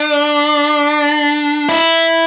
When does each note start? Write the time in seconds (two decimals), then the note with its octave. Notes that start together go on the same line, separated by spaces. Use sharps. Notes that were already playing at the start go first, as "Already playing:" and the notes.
Already playing: D4
1.69 E4